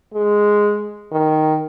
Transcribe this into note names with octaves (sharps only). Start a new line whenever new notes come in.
G#3
D#3